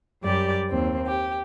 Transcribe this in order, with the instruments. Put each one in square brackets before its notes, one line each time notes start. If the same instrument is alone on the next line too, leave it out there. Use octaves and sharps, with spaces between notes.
[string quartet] F#2 G3 G4 D5
D#2 C4
G4